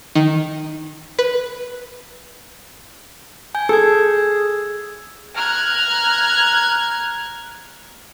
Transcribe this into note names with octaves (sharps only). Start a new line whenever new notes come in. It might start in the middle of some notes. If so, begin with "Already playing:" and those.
D#3
B4
G#5 G6
G#4 A4 E6 G#6
A#5 F6 F#6 G#6